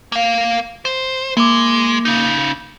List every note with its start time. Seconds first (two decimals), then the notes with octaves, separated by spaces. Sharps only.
0.12 A#3 F5
0.85 C5
1.37 G#3 A#3 D6
2.05 C#3 D#4